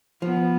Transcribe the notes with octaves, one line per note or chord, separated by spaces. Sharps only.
F3 B3